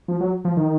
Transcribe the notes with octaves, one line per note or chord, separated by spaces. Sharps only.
F3
F#3
F3
D#3